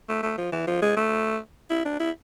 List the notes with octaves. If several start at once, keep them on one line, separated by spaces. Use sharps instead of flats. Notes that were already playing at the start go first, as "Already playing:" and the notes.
A3
A3
F3
E3
F3
G#3
A3
E4
D4
E4